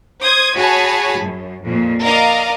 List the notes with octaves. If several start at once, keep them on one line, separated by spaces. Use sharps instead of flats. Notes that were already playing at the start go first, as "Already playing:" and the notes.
C5 D#6 G#6
F#4 G#4 C#5 G#5 A5 B5
F#2
F2 A#2
A#4 D5 D#5 F5 A#5